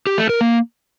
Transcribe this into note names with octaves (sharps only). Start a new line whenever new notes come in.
G4
A3
A#4
A#3